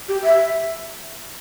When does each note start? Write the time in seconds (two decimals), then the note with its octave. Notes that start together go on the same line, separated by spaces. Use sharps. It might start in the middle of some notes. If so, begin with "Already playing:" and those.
0.08 G4
0.24 E5